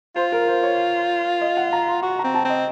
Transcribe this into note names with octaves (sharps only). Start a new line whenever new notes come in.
F4 C5
A#4
C5
C#5
D#5
F#5
A#5
C6
F#4 C#6
A#5
C4
A5
C4
D#5